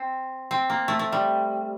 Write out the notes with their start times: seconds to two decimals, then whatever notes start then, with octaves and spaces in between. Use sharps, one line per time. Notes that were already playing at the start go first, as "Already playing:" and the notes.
Already playing: C4
0.51 C4
0.70 A#3
0.88 A3
0.99 A3
1.12 G3